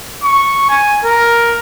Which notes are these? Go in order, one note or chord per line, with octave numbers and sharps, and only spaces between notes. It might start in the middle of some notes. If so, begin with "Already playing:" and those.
C#6
G#5
A#4